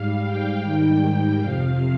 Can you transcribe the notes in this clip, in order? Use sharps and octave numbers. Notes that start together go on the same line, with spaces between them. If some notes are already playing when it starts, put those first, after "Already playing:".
Already playing: G#2 G3 F5
G5
G#2 D#3 G3 G5
F2 C3 F3 F5